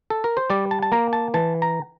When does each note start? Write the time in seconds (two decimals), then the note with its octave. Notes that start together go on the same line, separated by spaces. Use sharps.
0.10 A4
0.24 A#4
0.37 C5
0.50 G3 D5
0.71 A5
0.83 A5
0.92 A#3 A#5
1.13 A5
1.34 E3 A5
1.62 A#5